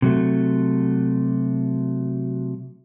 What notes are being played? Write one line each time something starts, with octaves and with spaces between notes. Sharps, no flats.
C3 F#3 A3